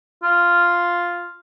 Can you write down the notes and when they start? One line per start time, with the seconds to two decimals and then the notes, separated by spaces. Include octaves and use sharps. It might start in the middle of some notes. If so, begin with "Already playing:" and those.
0.23 F4